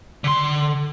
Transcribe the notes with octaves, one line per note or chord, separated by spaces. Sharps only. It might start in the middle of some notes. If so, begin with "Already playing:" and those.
D3 C6